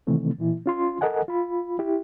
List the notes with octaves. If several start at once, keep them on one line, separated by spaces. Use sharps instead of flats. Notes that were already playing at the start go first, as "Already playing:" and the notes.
C3 D#3 E3 A3 C4
A#2 E3 E4
C#4 F4 C6
A4 A#4 D#5 F#5 G#5
F4 B5
E4 G4